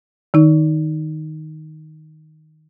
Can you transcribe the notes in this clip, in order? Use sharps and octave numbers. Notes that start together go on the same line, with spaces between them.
D#3 D#4